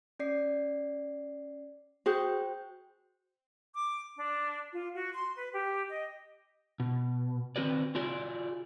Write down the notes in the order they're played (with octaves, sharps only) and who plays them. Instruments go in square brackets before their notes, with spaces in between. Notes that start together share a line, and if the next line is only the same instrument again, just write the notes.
[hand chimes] C#4 D5 C7
[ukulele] F#4 G#4 [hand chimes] C5 G5 G6
[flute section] D6
D4
F4
F#4
C6
B4
G4
D#5
[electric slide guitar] B2
D#3 C4 F#4 B4 D5
F4 F#4 G#4 D5